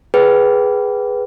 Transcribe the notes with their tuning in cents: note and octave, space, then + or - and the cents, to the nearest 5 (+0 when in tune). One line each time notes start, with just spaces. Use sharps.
G#4 +0 B4 +0 G5 -35